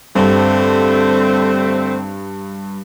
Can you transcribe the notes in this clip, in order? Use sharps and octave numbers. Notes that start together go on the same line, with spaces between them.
G2 D3 A3 C4